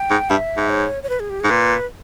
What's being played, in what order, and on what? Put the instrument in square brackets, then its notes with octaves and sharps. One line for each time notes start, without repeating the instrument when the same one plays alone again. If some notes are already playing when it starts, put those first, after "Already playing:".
Already playing: [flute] G5
[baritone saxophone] G#2
[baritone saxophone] G2 [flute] E5
[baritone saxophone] G#2
[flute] C#5
C#5
B4
G#4
G4
[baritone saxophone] G#2 [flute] G#4
[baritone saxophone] A#2 [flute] B4